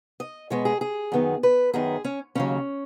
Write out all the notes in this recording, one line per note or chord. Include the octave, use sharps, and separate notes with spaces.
D#5
B2 G#3 B3 C#5
G#4
G#4
F#2 D#3 B3
B4
F#2 D#3 B3 G#4
C#4
D#2 C#3 F#3 C#4